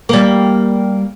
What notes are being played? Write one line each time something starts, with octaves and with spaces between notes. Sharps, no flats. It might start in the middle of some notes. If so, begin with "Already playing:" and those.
G3 A#3